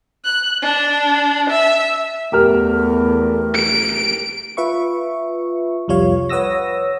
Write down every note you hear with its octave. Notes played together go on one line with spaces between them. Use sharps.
F#6
D4
E5
E2 A3 G4 A#4 F6
D7
F4 B4 E5 C#6
C2 F2 G3 F4 C#5 F5
B4 C#5 F#5 D#6 E6 A#6